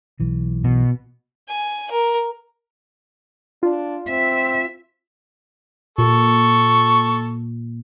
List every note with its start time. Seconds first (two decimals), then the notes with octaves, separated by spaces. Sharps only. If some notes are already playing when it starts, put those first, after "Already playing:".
0.20 B1 E3
0.64 B2
1.49 G#5
1.91 A#4
3.63 D4 F4
4.09 C4 E5
5.98 A#2 A4 C#6